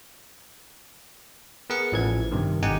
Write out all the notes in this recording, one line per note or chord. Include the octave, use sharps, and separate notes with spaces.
B3 G#4 A#4 F#5 C#7
A1 E3 F3 G#6
G2 C3 D#3
G#1 D#4 G4 F#5 G#5